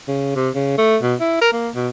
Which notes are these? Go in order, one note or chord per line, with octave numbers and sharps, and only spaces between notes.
C#3
C3
C#3
A3
B2
E4
A#4
A#3
B2